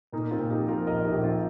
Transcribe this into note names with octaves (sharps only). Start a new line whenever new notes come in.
A#2 A#3 D#4
C4 F4
A#2
D#4 G4
F3
F4 A#4
A#1 A#4 D#5
D#4 G4
A#1
C4 F4